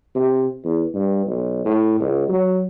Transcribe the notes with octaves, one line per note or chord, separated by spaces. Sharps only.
C3
E2
G2
B1
A2
C#2
F#3